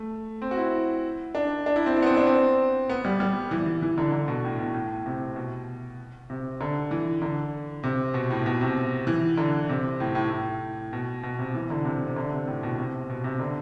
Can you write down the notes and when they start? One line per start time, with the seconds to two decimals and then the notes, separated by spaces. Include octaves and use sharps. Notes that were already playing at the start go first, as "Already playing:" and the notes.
Already playing: A3
0.42 C4
0.51 F#4
0.57 E4
1.35 D4
1.66 D4
1.76 E4
1.86 C4
1.97 D4
2.02 B3
2.06 C4
2.17 D4
2.27 C4
2.89 B3
3.05 G3
3.20 G3
3.51 E3
3.66 E3
3.82 E3
3.98 D3
4.12 D3
4.28 B2
4.44 A2
4.59 B2
4.74 A2
5.06 C3
5.36 B2
6.30 C3
6.61 D3
6.91 E3
7.22 D3
7.83 C3
8.14 B2
8.30 A2
8.46 B2
8.61 C3
9.07 E3
9.38 D3
9.69 C3
10.00 A2
10.15 A2
10.31 A2
10.93 B2
11.23 B2
11.39 C3
11.55 E3
11.70 D3
11.85 C3
12.07 C3
12.16 D3
12.32 C3
12.47 A2
12.63 B2
12.77 C3
13.10 B2
13.24 C3
13.40 D3